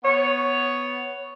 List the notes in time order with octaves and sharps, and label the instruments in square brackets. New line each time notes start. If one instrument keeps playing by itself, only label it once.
[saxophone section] B3 C#5